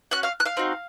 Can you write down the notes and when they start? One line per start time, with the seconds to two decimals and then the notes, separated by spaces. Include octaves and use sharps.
0.11 C#4 F#4 F#5 F#6
0.23 F5 F6
0.40 F#6
0.45 F5 F6
0.57 C4 D#4 F#4